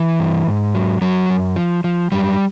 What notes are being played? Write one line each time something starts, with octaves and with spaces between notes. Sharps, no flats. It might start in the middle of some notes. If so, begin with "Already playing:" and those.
Already playing: E3
G2
G#2
F#3
F#2 F#3
F#2
F3
F3
F#2 G3